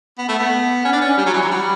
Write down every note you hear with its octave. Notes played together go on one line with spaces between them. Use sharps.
B3
A3
B3
C#4
D4
C#4
G3
F#3
E3
F#3
G3